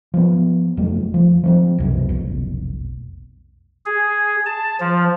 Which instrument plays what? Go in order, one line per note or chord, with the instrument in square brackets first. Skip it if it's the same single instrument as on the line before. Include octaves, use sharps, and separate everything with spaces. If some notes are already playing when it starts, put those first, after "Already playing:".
[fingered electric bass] F3 B3
F#1 F2 F#3 A3
F3
F3 B3 C4
C2 F#2 B2
F1 B1
[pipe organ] G#4
A5
F3